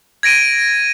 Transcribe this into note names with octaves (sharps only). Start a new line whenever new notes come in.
G#6 A#6 D7 D#7